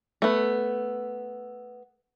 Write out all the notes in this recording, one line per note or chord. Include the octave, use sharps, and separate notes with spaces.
A3 B3